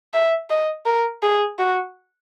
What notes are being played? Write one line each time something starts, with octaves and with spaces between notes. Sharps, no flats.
E5
D#5
A#4
G#4
F#4